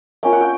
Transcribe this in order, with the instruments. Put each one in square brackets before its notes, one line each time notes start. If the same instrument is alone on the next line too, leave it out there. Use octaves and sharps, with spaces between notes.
[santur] A#3 C#4 F4 G5
F#5
G5